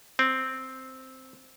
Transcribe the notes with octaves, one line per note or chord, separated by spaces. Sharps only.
C4